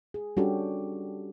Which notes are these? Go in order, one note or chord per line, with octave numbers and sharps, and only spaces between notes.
G#4
G3 C#4 D4 F#4 G4 A4